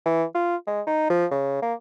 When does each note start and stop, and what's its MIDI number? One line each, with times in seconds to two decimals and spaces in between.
0.06 0.24 52
0.35 0.56 65
0.67 0.82 56
0.87 1.08 63
1.10 1.26 53
1.31 1.62 49
1.62 1.74 58